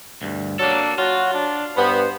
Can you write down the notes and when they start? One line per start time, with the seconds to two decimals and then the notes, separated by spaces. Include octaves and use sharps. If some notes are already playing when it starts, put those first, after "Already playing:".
0.22 D2 G2
0.59 F#3 A#3 D4 A4
0.98 F#3 F4 F#4
1.34 D4
1.77 G2 B3 C5